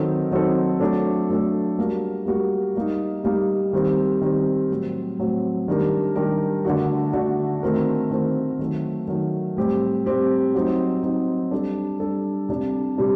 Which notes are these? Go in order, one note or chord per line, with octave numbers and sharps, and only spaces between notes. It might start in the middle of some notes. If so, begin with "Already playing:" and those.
Already playing: D#3 F#3 C4 D#4 A4
D#3 F#3 C4 D#4 A4
F#3 A3 D4 A4
F#3 A3 D4 A4
G3 A#3 F#4 A#4
G3 A#3 F#4 A#4
G3 A#3 D#4
G3 A#3 D#4
D#3 G3 C4
D#3 G3 C4
A2 F#3 C4
A2 F#3 C4
D#3 G3 D4 G4 A#4
D#3 G3 D4 G4 A#4
D3 A3 D4 F#4
D3 A3 D4 F#4
D#3 A3 C4 F#4 A#4
D#3 A3 C4 F#4 A#4
D#3 F#3 A3
D#3 F#3 A3
A2 G3 C4 G4
A2 G3 C4 G4
F#3 C4 D#4
F#3 C4 D#4
G3 D4 A4
G3 D4 A4
C3 G3 D4
C3 G3 D4